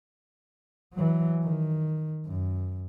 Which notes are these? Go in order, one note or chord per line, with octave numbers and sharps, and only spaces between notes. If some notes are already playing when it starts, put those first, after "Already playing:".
E3 F#3
D#3
F#2